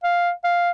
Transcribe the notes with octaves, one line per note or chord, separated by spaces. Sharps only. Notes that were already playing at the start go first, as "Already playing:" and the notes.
F5
F5